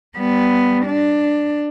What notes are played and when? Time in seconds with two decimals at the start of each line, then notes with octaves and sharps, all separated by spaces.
0.17 G3 B3
0.86 D4